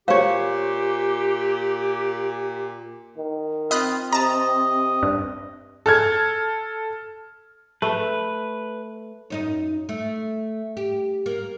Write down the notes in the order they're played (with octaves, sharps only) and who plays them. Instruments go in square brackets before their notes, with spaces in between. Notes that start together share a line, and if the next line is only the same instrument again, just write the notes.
[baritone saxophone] A#2 [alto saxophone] G4 [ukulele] C5 C#5 [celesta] F5
[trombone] D#3
[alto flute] C4 [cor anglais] F4 [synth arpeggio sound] D#5 B5 F#6
[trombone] C3 [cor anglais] D#5 [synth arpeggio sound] A5 A#5
[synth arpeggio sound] G2
[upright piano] A4 F6 G#6
[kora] A3 [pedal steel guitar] B4
[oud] F#2 D#4 D#5
A3
G4
A#3